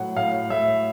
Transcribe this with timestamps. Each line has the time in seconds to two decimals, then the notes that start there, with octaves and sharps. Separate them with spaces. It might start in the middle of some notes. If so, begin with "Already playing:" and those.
Already playing: A2 F#3 F#5
0.16 A2 F5
0.50 A2 E5